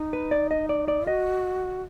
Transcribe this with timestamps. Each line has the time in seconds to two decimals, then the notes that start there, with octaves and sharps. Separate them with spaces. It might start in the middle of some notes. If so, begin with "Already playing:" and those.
Already playing: D#4
0.13 B4
0.31 D5
0.51 D#5
0.69 D5
0.88 D5
1.07 F#4 D#5